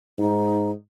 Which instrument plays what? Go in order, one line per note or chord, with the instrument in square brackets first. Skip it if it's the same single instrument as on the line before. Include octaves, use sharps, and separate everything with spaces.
[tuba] G#2 [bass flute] D#4